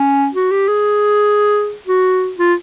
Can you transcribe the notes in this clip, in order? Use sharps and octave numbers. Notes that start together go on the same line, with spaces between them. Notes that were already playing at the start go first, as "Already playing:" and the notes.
Already playing: C#4
F#4
G4
G#4
F#4
F4